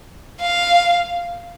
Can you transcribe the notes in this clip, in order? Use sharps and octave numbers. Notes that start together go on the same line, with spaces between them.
F5